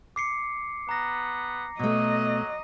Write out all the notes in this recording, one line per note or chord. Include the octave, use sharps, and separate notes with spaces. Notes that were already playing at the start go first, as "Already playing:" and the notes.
D6 C7 C#7
B3 A#5 A#6
B2 F#3 A3 D#5